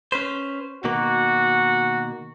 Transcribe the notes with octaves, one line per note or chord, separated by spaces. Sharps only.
C#4 B4 C5
B2 D#3 A#3 F#4